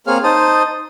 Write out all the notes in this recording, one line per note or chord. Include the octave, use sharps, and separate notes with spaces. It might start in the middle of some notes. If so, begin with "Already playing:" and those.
A#3 C4 G#4 C#5 F5 F6
D#4 C5 A5 D#6